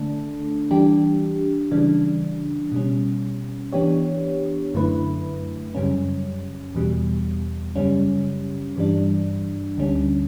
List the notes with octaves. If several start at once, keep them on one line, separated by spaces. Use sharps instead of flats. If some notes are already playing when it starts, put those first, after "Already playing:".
Already playing: D3 A3 D4 A4
E3 G3 D4 G4
C#3 E3 G3 D4
B2 G3 C#4
E3 B3 D4 G4 C#5
F#2 D3 A3 E4 B4
F#2 C#3 G3 C#4
E2 B2 G3
F#2 C#3 G3 C#4
G2 E3 G3 D4
D2 D3 G3 C#4